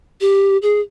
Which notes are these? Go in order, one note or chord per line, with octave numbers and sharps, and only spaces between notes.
G4
G#4